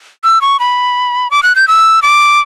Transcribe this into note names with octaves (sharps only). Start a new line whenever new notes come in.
E6
C#6
B5
D6
F#6
G6
E6
D6